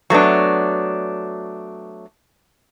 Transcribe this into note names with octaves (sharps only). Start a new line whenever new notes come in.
F#3 A3 B3 D4